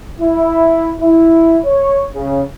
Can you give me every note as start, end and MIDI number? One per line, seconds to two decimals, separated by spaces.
0.21 0.93 64
1.01 1.59 64
1.66 2.06 73
2.12 2.42 49